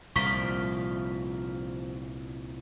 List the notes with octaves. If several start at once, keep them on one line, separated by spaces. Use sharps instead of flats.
C2 A#2 F3 A#4 F5 C#6 B6 G7